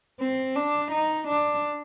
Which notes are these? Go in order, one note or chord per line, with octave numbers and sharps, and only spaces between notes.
C4
D4
D#4
D4